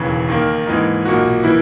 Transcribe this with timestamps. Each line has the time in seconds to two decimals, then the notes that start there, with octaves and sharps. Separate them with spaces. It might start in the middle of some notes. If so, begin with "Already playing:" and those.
Already playing: E1 D#2 C#3 E3
0.28 D#2 D#3 A#3
0.67 G#2 E3 A#3 D#4
1.05 B1 A#2 A#3 D#4 F#4
1.43 E3 A#3 E4